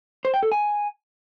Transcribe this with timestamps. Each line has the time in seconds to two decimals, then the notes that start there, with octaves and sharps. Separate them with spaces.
0.25 C5
0.34 G5
0.43 A4
0.52 G#5